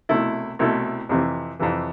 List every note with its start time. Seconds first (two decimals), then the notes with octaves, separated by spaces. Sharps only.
0.09 C2 B2 A3 E4 A4
0.59 C2 B2 A3 E4 A4
1.09 F2 C3 E3
1.59 F2 C3 E3